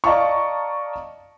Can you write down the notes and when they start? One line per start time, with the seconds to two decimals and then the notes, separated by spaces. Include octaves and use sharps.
0.04 D5 D#5 F5 A5 A#5 C#6